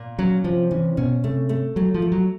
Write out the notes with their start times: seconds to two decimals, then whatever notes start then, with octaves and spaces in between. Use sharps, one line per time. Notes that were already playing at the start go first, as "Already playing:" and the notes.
Already playing: A#2
0.19 F#3 C#4
0.44 C3 F3
0.71 E3 C#4
0.97 B2 C#4
1.24 C3 A3
1.49 A3
1.76 F#3 A3
1.94 F3
2.02 A3
2.12 F#3